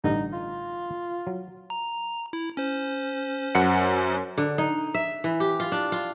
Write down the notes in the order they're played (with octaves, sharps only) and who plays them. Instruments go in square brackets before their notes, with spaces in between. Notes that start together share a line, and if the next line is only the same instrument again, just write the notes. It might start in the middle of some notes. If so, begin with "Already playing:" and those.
[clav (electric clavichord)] A1 G2 D3 [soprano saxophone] D#4
[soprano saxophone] F4
[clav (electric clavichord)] F#3
[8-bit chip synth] A#5
E4
C#4 C5
[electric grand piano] F#2 F#5 C#7
[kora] D3
D#4
E5
E3
G4
F4
D4
F4